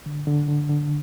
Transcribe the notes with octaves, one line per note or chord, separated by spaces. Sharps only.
D3
D3
D3
D3